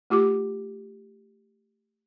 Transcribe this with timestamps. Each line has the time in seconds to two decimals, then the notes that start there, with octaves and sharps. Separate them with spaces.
0.10 A3 F4 G4 D6